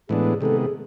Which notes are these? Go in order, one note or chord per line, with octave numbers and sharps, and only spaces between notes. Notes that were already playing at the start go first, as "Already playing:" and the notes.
A2 E3 G#3 B3 D4 G#4
C3 D#3 G#3 B3 A4
G#4